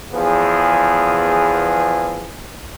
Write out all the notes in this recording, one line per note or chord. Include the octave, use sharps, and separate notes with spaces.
E2 F3 B3 G#4